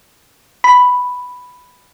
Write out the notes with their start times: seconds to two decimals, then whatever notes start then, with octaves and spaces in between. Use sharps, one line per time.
0.64 B5